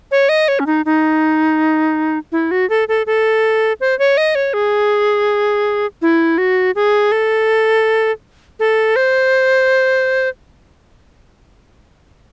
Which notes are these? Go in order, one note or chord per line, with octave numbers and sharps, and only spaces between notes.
C#5
D#5
C#5
C#4
D#4
D#4
E4
F#4
A4
A4
A4
C5
C#5
D#5
C#5
G#4
E4
F#4
G#4
A4
A4
C5